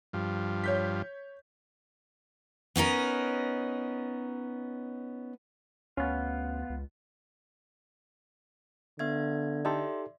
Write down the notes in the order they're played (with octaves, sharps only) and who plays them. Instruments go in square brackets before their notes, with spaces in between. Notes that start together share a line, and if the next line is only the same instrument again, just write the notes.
[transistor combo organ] G2 F3
[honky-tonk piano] C#5 G6 B6
[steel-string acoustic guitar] B3 C#4 D#4 A#4
[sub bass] D2 [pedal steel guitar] B3 F4 [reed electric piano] C#4
[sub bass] C#2
[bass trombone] D3 [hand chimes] B3 E5 G#6
[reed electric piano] D#4 G4 A4 [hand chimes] D5 E5 C6